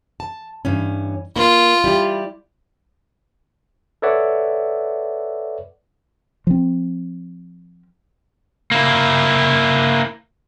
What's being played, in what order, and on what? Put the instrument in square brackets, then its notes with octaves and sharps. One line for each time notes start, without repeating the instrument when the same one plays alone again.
[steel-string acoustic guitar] A5
G2 E3 C#4
[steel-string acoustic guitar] A#3 [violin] F4
[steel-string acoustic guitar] G3 E4 G4
[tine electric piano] A4 B4 C#5 D5 E5 F#5
[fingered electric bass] F3 C4
[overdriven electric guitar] A#3 E4